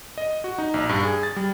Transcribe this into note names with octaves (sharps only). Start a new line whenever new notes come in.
D#5
F#4
D#4
A#1
G2
G#4
A6
G3